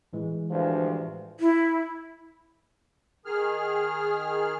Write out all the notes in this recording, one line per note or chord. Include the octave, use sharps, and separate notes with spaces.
A2 E3 G#3
D2 G2 F3
E4
D#3 G#4 F6